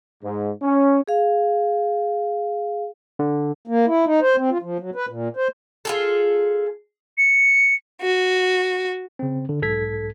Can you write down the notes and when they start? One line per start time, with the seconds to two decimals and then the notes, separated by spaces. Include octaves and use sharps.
0.24 G#2
0.62 C#4
1.08 G#4 F5
3.19 D3
3.67 A#3
3.87 E4
4.05 D#4
4.21 C5
4.36 C4
4.50 F4
4.62 F3
4.80 F#3
4.95 B4
5.09 A#2
5.37 C5
5.85 F4 G#4 A4
7.18 C#7
8.02 F#4
9.19 C#3 C4
9.49 D3
9.62 B1 G#2 A4 G#6 B6